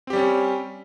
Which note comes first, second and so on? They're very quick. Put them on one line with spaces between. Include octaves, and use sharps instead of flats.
C4 G4 G3 C#4